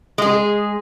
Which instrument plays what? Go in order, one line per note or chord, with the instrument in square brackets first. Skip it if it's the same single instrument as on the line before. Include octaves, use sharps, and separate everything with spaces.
[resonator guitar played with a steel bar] G#3 G#4